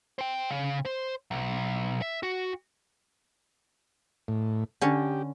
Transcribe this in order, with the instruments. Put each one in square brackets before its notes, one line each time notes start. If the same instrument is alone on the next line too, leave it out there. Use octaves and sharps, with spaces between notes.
[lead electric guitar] C5 G5
C#3
C5
B1
E5
F#4
[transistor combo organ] A2
[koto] D3 C#4 [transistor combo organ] G4